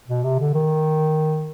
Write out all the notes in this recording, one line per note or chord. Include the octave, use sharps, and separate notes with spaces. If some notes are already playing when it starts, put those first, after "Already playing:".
B2
C3
D3
D#3